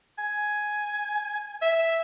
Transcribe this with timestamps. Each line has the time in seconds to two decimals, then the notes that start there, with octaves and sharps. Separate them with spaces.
0.18 G#5
1.62 E5